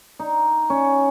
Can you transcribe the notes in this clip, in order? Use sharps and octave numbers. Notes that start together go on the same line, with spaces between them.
D#4
C#4